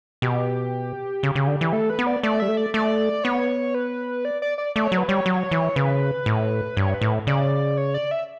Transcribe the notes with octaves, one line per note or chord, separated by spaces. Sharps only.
B2 G4
C#3
C#3
D3
E3
A3 A4
B4
B3
D5
A3 D5
G3 E5
A3
D5
A3 D5
B3 C#5
B4
D5
D5
D5
A3 D5
C#5
F#3
B4
G3 C#5
F#3
E3
C#3 B4
A2
G2 C#5
B4
A2
C#3 D5
C#5
D5
E5